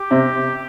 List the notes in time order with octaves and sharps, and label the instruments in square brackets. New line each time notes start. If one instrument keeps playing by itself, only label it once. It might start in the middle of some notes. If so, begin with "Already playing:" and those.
Already playing: [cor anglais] G4
[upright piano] C3